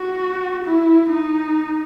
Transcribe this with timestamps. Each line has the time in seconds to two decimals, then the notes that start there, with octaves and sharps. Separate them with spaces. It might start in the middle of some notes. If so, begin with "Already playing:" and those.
Already playing: F#4
0.65 E4
1.10 D#4